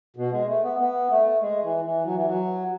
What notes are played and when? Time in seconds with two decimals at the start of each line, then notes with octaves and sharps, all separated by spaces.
0.16 B2
0.32 G#3
0.48 A3
0.63 B3
0.79 B3
1.10 A3
1.42 G#3
1.63 E3
1.84 E3
2.05 F#3
2.15 E3
2.25 F#3